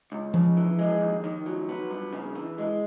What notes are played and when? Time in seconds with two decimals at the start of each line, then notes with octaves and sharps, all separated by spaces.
0.12 C#2
0.33 C#3 F3
0.57 E3
0.79 G#3
1.01 D#2
1.24 D#3
1.46 F#3
1.69 B3
1.90 G2
2.13 C#3
2.35 E3
2.58 G#3